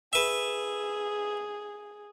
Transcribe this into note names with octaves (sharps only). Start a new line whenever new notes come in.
G#4 B4 E5